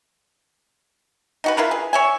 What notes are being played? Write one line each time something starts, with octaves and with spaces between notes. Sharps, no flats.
D#4 F#4 B4
E4 F4 A#4 B4
G#4
C#5 E5 G#5